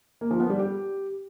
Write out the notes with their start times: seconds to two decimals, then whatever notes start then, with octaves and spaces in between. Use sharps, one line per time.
0.21 A#3
0.31 F3
0.40 B3
0.50 G3
0.59 G4